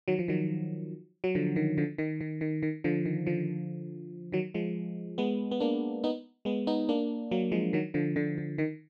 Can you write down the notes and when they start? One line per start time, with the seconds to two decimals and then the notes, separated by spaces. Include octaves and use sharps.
0.08 D#3 F#3
0.19 F3
0.28 D#3 F#3
1.24 F#3
1.35 D3 F3
1.56 D#3
1.78 D3 F3
1.98 D#3
2.21 D#3
2.41 D#3
2.63 D#3
2.84 D3 F3
3.05 D#3
3.27 D3 F3
4.32 D#3 F#3
4.54 F3 G#3
5.18 G#3 B3
5.51 B3
5.60 A#3 D4
6.04 B3 D#4
6.45 G#3 B3
6.67 B3 D#4
6.89 A#3 D4
7.31 F#3 A#3
7.52 F3 G#3
7.73 D#3 F#3
7.94 D3 F3
8.16 D3
8.38 D3
8.58 D#3